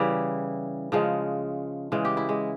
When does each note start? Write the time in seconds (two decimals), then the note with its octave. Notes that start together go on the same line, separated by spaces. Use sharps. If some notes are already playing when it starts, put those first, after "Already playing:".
Already playing: C#3 E3 G3 E4
0.92 C#3 F3 G#3
1.92 C#3 E3 G#3
2.05 G4
2.17 E4
2.29 G#3